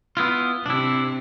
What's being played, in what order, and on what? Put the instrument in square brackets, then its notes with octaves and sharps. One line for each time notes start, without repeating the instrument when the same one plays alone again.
[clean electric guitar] B3 E4 F4
[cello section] C3 C4 [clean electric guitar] D4 E4